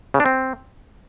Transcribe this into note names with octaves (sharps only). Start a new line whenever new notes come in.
C#3
D4
C4